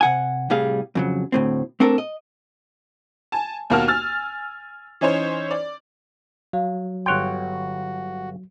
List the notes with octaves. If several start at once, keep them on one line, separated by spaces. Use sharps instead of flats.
C3 F#5 G#5
C2 A2 G3 G#4 F5
F2 C#3 F#3
D2 A2 C4
A3 C4 D4 A4 A#4
D#5
G#5 A5
D#2 B2 A#3 F#4 A5 F6
G#5 E6 F6 A6
E3 C#4 D#4 C5 C#5
D5
F#3 F5
G1 F#4 C#5 G5 C6 F#6